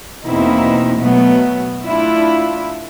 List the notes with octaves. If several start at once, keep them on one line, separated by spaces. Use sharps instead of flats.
E2 B2 A#3 C4 D#4 E4
B2 F#3 A3 B3
A3 D4 E4 F4